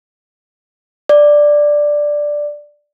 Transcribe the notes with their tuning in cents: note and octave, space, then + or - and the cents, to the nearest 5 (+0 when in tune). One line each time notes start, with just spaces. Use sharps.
D5 +5